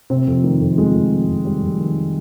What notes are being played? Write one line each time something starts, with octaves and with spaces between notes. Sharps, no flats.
C3 C4
F2
D#3
F2
F2 G#3
F2
F2
F2
F2 G3
F2
D#3